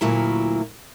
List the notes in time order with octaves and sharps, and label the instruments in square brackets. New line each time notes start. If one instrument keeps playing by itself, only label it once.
[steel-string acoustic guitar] D2 A#2 F#3 E4 A#4